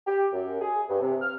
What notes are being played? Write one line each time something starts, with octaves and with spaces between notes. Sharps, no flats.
G4
F#2
G#4
G2
C3
F6